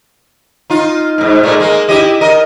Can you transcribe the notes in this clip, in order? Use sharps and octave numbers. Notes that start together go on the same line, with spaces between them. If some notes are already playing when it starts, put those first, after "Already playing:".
D#4 F4
G#2 B2
A#2 G#3 A3
G#3 A#3
E4 G4 D#5
A#4 D#5